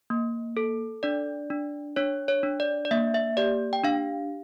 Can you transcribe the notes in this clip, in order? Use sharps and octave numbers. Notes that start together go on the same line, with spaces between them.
A#3
A4
D4 D5
D4
D4 C#5
C#5
D4
D5
D5
A#3 E5
E5
G4 D5
G5
D4 F5